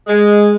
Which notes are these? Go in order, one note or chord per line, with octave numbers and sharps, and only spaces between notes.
G#3